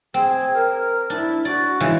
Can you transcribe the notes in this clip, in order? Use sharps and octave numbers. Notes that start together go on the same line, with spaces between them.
C4 G#4
A#4
D4 E4
F#4 D5
C#3 E3 G#3